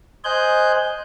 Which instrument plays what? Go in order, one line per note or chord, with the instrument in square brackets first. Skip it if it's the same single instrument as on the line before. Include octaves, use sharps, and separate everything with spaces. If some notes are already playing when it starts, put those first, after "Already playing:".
[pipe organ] C5 D#5 G#5 F#6 G6